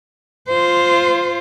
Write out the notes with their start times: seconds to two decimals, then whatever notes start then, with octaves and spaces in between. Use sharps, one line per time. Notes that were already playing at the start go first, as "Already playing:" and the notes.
0.49 F4 C5